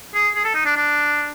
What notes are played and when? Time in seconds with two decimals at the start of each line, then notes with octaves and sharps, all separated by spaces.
0.15 G#4
0.36 G#4
0.45 A4
0.55 D#4
0.65 D4
0.76 D4